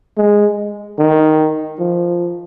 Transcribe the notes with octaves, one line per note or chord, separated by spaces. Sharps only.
G#3
D#3
F3